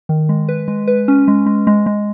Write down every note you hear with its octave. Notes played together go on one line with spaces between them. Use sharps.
D#3
G#3
B4
G#3
B4
C#4
G#3
G#3
G#3
G#3